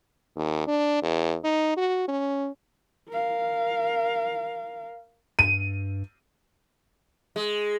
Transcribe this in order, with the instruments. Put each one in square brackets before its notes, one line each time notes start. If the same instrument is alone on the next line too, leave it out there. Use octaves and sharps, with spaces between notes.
[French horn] D#2
D4
E2
D#4
F#4
C#4
[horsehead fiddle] A#4 F5
[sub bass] G2 [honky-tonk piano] D#7
[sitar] G#3